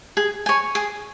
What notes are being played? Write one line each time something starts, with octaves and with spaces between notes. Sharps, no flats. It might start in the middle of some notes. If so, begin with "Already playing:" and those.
G#4
C#5 G#5
G#4